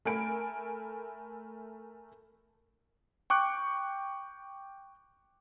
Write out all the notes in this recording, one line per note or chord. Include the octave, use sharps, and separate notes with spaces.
A3 A#4 G#5 B5 D7
G5 C#6 D6 F#6